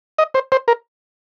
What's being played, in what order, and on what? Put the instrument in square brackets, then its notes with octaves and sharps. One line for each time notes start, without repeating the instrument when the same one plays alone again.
[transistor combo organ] D#5
C5
C5
A#4